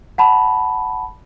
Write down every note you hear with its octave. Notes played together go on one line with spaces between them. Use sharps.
F#5 A5 B5